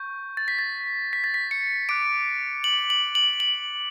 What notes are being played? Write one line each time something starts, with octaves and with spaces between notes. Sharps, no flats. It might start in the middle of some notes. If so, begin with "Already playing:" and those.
Already playing: C#6 G6
A6
B6
A6
B6
A6
B6
C#7
D6 F#6 D7
F#7
F#7
F#7
F#7